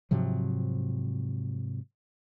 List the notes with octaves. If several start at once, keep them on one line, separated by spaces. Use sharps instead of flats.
G#2 C3 F3 F#3